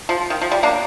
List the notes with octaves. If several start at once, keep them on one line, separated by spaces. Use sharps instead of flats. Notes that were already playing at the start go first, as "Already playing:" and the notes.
F3
D#3
F3
G3
A#3 D4